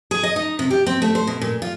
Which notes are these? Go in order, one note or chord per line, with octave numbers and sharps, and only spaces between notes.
G#4
D#5
D#4
C3
G4
C4
A3
C5
B2
A#2
F4